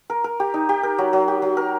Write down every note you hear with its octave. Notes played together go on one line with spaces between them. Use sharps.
A#4
A#4
G4
D#4
G4
A#4
F#3
F#3
G4
F#3
A#4